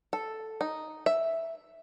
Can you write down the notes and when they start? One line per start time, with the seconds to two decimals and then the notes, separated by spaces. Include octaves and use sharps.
0.13 A4
0.61 D#4
1.06 E5